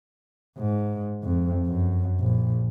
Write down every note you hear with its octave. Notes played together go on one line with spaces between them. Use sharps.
G#2
F2
F#2
A#1